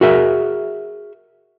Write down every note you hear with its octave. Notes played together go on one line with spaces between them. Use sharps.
F#4 G#4 A#4 E5